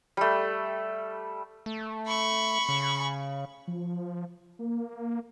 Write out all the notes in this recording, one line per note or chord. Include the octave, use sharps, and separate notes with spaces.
G3 A3
A3
B5 C#6
C#3
F3
A#3